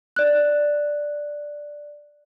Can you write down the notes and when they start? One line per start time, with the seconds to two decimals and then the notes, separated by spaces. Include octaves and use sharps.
0.16 D5 F#6